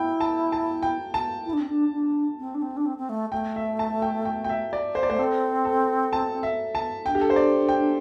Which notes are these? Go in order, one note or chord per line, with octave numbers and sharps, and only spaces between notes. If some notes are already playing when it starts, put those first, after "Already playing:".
Already playing: E4 G5
A5
A5
G5
A5
E4
D4
C4
D4
D4
C4
D4
C4
D4
C4
C4
A3
A3 G5
E5
A5
G5
G5
G5
E5
D5
C5
D5
A3 C5
C4 A4
A4
A5
E5
A5
D4 G5
G4
A4
C5
D5
G5